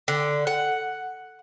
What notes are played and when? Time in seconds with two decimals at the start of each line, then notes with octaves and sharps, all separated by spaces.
0.08 D3
0.47 F#5